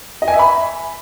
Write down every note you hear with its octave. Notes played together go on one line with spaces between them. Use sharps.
D#5
G#5
E5
B5